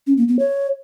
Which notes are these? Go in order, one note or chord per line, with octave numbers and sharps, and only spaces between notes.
C#4
A#3
B3
C#5